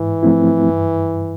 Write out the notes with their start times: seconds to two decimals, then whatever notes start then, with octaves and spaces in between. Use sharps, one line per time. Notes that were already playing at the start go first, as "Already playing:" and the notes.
Already playing: G#2 E3
0.23 F3 A3 C4 E4
0.69 G2